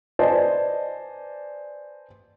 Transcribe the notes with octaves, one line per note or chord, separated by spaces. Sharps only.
B4 C5 D5 D#5 G#5 A5